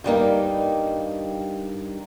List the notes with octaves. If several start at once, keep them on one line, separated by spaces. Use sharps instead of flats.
G2 G3 A#3 D#4